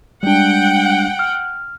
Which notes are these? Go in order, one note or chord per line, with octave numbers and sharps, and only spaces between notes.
G3 G#3 D4 F#5 G5
F6